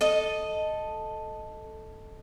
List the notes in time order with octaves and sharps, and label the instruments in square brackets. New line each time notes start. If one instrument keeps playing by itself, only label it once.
[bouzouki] A4 D#5